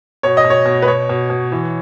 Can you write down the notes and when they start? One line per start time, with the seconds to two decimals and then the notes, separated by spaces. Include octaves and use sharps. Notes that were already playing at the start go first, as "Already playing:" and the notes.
0.23 B2 C#5
0.37 D#5
0.45 B2
0.50 C#5
0.66 B2
0.82 B4
0.88 B2 C#5
1.09 B2
1.30 B2
1.52 E3